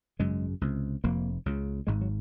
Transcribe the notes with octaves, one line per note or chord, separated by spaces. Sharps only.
G#1 F#2 C#3 G#3
C#2 C3
F1 F2 C3 A#3
C#2 C#3
G#1 G#2 G#3
F#3